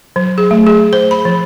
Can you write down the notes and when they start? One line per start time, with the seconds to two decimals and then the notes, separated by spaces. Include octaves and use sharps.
0.16 F#3
0.38 G#4
0.51 A3
0.67 G#4
0.93 C5
1.11 B5
1.25 F3